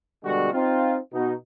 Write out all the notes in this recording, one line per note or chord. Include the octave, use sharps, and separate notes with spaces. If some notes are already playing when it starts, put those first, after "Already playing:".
B2 D3 G3 G#3 D4 F#4
C4 D#4 F4
B2 D#4